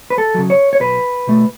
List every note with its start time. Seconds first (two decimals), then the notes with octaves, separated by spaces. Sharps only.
0.10 B4
0.18 A4
0.34 C#3 F#3
0.50 C#5
0.73 C#5
0.81 B1 B4
1.27 B2 A3